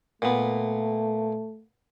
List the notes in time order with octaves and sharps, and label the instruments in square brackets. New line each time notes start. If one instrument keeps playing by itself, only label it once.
[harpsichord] A#2 B3 [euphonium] A3